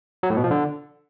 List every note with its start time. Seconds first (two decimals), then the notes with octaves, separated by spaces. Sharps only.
0.23 F#3
0.30 A2
0.37 B2
0.44 F3
0.51 D3